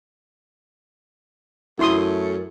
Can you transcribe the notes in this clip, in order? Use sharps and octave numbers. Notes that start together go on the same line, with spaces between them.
F#2 A3 E4 C6 D#6